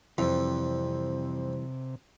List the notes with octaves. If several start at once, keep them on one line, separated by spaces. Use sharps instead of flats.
F2 C3 E3 G3